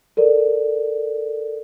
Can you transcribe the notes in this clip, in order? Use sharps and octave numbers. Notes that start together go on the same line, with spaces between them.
A4 A#4 D5